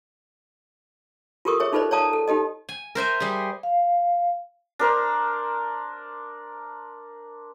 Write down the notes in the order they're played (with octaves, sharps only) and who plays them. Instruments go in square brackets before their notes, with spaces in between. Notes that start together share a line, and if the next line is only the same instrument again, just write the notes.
[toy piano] F4 G4 A4 A#4 C#6 D#6
G#4 C#5 E5
D#4 F4 A4 B4 C5 D5
C#5 D5 F5 A5 A#5 D#6
A4
D#4 G4 A4 D#5
[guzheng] G#5
A#4 C5 E5 G#5
G3 G#4
[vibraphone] F5
[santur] D4 A#4 C5